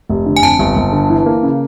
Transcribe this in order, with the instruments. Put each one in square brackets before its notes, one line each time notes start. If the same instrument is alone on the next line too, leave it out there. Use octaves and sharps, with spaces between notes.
[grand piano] F1
D3
[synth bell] G#5
[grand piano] F2 [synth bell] A5
[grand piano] G1
G1
D3
E3
A#3
C#3